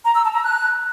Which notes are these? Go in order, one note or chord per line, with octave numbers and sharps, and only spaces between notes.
A#5
E6
A5
A#5
F#6